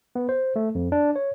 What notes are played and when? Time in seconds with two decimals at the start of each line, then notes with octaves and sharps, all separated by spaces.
0.15 B3
0.29 C5
0.56 A3
0.75 F2
0.92 D4
1.16 C#5